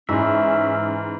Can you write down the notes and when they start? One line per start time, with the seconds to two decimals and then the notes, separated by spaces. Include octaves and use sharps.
0.09 G#2 E3 C#4 E5